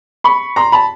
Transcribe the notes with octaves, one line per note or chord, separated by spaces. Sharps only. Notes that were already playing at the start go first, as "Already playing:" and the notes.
B5 C#6
A#5 C6
A5 B5